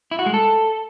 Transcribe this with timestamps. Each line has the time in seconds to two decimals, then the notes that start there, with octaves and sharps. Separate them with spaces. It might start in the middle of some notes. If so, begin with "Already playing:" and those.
0.11 E4
0.19 F#4
0.26 G#3
0.34 A4